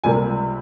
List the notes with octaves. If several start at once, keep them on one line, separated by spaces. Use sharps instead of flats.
C#2 C3 G3 A#3 G#5